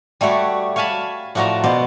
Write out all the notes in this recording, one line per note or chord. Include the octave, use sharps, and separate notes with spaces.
G3 A3 F#4 C#5 D5
C#5 F5 G#5 A5 B5
A2 F3 F#4 D5 A5 A#5
B2 B3 C5 D5